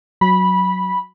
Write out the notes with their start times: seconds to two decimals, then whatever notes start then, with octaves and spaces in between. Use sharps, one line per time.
0.21 F#3 B5